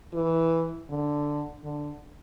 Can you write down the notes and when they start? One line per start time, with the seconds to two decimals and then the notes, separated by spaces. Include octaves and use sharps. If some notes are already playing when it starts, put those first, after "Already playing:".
0.14 E3
0.90 D3
1.64 D3